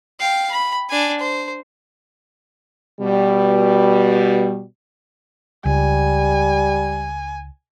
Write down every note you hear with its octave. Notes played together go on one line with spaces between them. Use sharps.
F5 G5
B5
D4 G#5
C5
B2 G3
C#2 G3 G#5